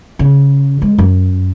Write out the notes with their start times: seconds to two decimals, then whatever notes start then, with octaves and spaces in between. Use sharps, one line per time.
0.19 C#3
0.82 G#3
0.98 F#2